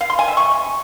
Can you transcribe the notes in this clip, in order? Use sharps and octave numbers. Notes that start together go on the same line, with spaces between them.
F5
C6
G#5
E5
C#6